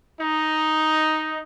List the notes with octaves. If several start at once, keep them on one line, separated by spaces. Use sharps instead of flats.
D#4